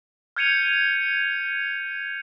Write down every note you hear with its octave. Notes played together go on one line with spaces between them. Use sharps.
F6 G6 G#6 C#7 D#7 F7